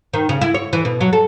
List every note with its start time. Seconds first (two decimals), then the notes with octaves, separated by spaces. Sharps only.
0.13 D#3
0.29 C#3
0.41 E4
0.54 C#5
0.73 E3
0.85 B2
1.01 F#3
1.13 A4